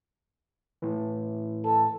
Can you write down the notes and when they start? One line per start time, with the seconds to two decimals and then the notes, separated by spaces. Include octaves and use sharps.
0.82 A2 E3
1.65 A4